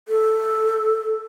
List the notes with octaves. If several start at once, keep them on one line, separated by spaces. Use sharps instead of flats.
A4